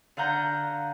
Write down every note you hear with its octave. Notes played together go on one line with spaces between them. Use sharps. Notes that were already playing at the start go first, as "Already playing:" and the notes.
D3 F5 F#5 A#5 G6